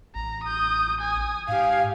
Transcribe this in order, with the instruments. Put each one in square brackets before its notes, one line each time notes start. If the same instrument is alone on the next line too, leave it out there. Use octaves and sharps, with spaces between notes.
[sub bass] A1 [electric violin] A#5
[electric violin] D#6 G6
G#5 D#6
[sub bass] G#2 [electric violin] G4 G#5 [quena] F5